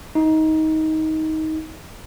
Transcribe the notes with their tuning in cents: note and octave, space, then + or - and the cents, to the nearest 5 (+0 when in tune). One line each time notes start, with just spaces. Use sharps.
D#4 +20